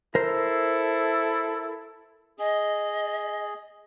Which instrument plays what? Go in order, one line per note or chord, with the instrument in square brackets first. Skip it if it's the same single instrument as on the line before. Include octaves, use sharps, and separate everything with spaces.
[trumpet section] E4 A4 [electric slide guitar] A#4 C5
[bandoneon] G#4 [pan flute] D#5